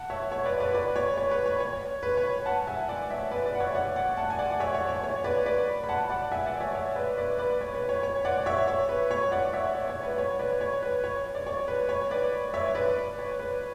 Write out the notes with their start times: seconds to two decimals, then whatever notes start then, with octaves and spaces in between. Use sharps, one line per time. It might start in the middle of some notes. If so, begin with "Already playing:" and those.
Already playing: F#5 A5
0.10 C#5 E5
0.32 C#5
0.46 B4 D5
0.60 B4 D5
0.74 B4 D5
0.96 C#5
1.17 C#5
1.31 B4
1.46 C#5
1.60 C#5
2.03 B4
2.17 C#5
2.46 F#5 A5
2.67 E5 G#5
2.89 D5 F#5
3.10 C#5 E5
3.31 B4 D5
3.46 B4 D5
3.55 F#5
3.60 C#5 E5
3.75 D5 F#5
3.96 D5 F#5
4.17 F#5 A5
4.30 G#5
4.39 D5 F#5
4.50 F#5
4.60 C#5 E5
4.75 C#5
4.89 C#5
5.04 C#5
5.24 B4 D5
5.46 B4 D5
5.84 B5
5.89 F#5 A5
6.10 D5 F#5
6.32 E5 G#5
6.46 D5 F#5
6.60 C#5 E5
6.75 C#5 E5
6.96 B4 D5
7.18 B4 D5
7.39 B4 D5
7.61 C#5
7.75 B4
7.89 C#5
8.03 C#5
8.25 D5 F#5
8.46 C#5 E5
8.68 C#5
8.89 B4
9.11 C#5
9.32 D5 F#5
9.53 C#5 E5
9.75 C#5
9.90 C#5
10.03 B4
10.18 C#5
10.39 B4 D5
10.61 C#5
10.83 B4
11.04 C#5
11.35 D5
11.47 C#5
11.68 B4
11.89 C#5
12.11 B4 D5
12.54 C#5 E5
12.75 B4 D5
13.19 C#5
13.39 B4